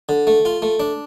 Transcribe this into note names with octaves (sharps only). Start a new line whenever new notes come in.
D3
A3
F4
A3
D4